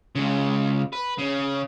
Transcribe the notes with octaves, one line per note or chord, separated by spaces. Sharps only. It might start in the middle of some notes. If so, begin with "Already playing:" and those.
C#2 C#3
B4
C#3